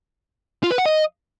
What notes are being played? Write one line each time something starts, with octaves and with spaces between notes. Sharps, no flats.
F4
B4
F#5
D#5